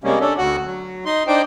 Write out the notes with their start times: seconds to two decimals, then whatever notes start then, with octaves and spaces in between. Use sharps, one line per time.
0.04 C3 G3 G#3 A#3 C#4
0.20 C#4 D4 A4
0.38 D2 F#4 F#5
0.66 F#3
1.05 D#4 C6
1.27 D4 D#4 C5 G5